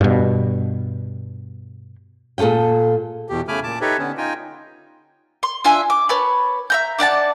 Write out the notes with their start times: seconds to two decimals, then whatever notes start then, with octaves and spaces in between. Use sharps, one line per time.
0.01 G2 B2
2.38 A#2 G#4 A4 D#5 G5
3.28 E2 B2 G4
3.48 C#3 A3 G#5 B5 D6 F6
3.64 A#2 A5 D6
3.81 D#4 G4 A4 B4 C#5 E5
3.99 D3 B3 C#4
4.18 D#4 F4 G5 G#5
5.43 C6
5.64 D4 F4 E5 G#5
5.90 D6
6.09 B4 C#5 A5 B5
6.70 E5 A#5 G6
6.99 D4 D5 F#5 A5